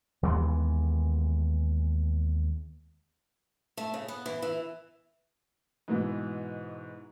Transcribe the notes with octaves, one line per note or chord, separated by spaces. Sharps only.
D#2 E3 G#3 B3
A3
C#3
B3
E3
E3
G#2 B2 E3 B3